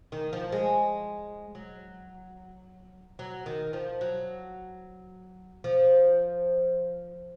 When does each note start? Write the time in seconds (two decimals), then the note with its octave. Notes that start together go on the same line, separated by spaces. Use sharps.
0.12 D#3
0.33 F3
0.52 G#3
1.55 F#3
3.19 F#3
3.46 D#3
3.73 F3
4.01 F#3
5.64 F3